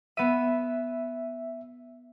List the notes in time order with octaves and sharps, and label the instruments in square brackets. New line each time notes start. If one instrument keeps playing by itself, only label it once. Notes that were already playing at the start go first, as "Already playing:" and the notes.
[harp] B3 D#7 [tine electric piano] E5